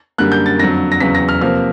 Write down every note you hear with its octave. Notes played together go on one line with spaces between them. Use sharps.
F#2 D3 G3 A#3 F#6
G6
A6
F2 D3 F#3 A#6
A#6
E2 C#3 F#3 B6
A#6
F6
C3 F3 A#3 F6